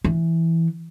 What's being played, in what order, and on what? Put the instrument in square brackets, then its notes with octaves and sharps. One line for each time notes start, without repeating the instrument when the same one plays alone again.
[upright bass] E3